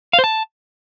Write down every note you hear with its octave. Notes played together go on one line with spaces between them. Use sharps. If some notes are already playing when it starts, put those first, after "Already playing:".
F5
C5
A5